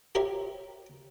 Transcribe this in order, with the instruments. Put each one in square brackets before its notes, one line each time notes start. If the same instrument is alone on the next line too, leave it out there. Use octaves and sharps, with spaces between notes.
[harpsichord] G4 A#4 C5 C#5 E5